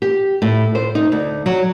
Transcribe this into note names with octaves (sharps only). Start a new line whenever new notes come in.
G4
A2
C5
D#4
D2
F#3